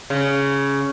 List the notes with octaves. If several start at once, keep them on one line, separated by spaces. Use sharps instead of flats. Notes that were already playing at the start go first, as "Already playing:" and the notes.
C#3